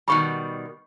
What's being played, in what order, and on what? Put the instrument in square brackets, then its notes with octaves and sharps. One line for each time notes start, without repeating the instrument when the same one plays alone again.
[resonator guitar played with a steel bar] B2 D#3 G3 [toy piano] B5 C#6